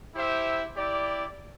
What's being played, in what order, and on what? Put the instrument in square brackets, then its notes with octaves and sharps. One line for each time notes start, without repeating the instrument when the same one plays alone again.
[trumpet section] E4 G4 C5 E5
E4 G4 D5